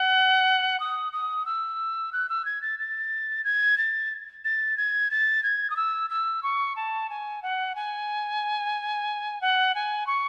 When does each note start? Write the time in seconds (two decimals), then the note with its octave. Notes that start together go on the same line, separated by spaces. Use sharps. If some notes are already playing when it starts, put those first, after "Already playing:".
Already playing: F#5
0.80 D#6
1.13 D#6
1.46 E6
2.13 F#6
2.29 E6
2.45 G#6
2.62 A6
2.79 A6
3.44 G#6
3.78 A6
4.45 A6
4.77 G#6
5.11 A6
5.43 G#6
5.70 D#6
5.77 E6
6.10 E6
6.43 C#6
6.76 A5
7.10 G#5
7.43 F#5
7.76 G#5
9.41 F#5
9.75 G#5
10.07 C#6